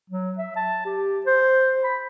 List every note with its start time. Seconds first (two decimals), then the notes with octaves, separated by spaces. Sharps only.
0.10 F#3
0.38 E5
0.56 A5
0.86 G4
1.26 C5
1.84 B5